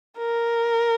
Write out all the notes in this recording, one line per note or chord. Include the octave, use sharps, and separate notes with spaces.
A#4